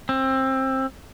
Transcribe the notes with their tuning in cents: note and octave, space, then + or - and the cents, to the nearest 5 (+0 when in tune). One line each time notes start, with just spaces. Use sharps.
C4 +20